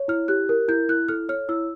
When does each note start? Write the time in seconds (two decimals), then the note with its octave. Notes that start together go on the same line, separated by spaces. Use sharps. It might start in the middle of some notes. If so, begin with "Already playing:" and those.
Already playing: C#5
0.08 E4 F6
0.28 G4 F#6
0.49 A#4
0.68 E4 G6
0.89 E4 F#6
1.09 A4 F6
1.29 C#5 F6
1.49 E4 E6